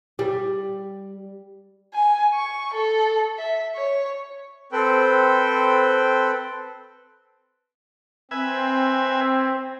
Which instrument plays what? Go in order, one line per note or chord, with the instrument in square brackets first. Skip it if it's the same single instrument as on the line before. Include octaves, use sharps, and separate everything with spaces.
[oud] G3
[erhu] G#5
C#6
A4
E5
C#5
[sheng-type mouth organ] C4 A4 B4 C5 G5
[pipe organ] C4 [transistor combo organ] B4 E5 G#5